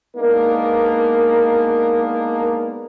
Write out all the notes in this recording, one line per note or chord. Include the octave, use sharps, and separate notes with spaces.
G#3 A#3 B3 D4 D#4 A#4